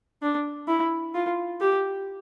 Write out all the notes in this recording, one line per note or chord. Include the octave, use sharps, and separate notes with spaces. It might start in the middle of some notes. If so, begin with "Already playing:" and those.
D4
E4
F4
G4